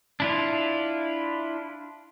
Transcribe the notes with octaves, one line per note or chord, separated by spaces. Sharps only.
D4 E4 F4